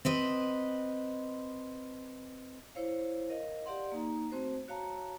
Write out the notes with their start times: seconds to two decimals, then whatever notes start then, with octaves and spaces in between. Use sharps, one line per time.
0.05 C4 B4 D#5
2.75 E4 C5 C#5 F5
3.30 A#4 D#5 F5
3.66 G4 D5 F5 F#5 C6
3.92 A#3 D#4 A#5
4.32 A3 C4 F#4 C5
4.68 F#4 C#5 F5 A5 A#5